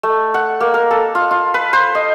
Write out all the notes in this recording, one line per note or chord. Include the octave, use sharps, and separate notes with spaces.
A3
F#5
A#3
A#4
A4
F4
F4
B4
C5
D#5